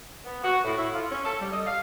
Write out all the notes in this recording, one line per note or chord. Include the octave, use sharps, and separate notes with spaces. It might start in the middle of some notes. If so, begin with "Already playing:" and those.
B3
F#4
A2
E4
F4
C#4
A4
G3
D#5
F5